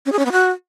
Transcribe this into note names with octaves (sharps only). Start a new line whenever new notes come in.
C#4
G#4
C#4
B3
F#4